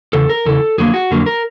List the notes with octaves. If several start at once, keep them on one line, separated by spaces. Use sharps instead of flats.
E2 C#3 A4
A#4
E2 C#3 E3 A4
F2 D3 F#3 A#3 G#4
F#4
F2 D3 F#3 A#3
A#4